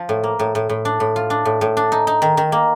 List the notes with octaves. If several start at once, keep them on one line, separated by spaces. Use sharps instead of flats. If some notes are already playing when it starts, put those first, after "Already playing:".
Already playing: F3
A2
A#3
A2
A2
A2
D4
A2
F4
D4
A2
A2
D4
D#4
D#4
D#3
D#3
A#3